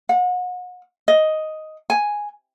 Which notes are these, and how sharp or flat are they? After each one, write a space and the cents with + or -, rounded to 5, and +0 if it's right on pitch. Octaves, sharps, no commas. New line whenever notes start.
F#5 -35
D#5 +5
G#5 +0